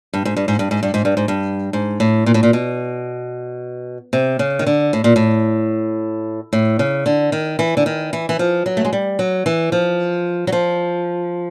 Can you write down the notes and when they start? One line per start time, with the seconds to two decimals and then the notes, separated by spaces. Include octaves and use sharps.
0.14 G2
0.25 G#2
0.37 G2
0.48 G#2
0.59 G2
0.71 G#2
0.83 G2
0.94 G#2
1.05 G2
1.17 G#2
1.28 G2
1.73 G#2
2.00 A2
2.26 A#2
2.34 A2
2.43 A#2
2.53 B2
4.13 C3
4.39 C#3
4.59 D#3
4.67 D3
4.93 A2
5.04 A#2
5.16 A2
6.53 A2
6.79 C#3
7.06 D3
7.32 D#3
7.59 E3
7.77 D3
7.86 D#3
8.13 E3
8.29 E3
8.39 F3
8.66 F#3
8.77 A3
8.85 G#3
8.93 G3
9.19 F#3
9.46 E3
9.72 F3
10.47 F#3
10.52 F3